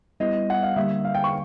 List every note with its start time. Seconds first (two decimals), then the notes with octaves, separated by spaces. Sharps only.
0.20 G3 B3 E4 D#5
0.50 F#5
0.63 F5
0.76 D3 G3 A#3 E5
1.05 F5
1.15 G5
1.24 C#6